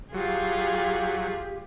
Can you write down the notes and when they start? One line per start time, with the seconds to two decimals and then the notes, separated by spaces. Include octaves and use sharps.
0.14 F#3 F4 G4 G#4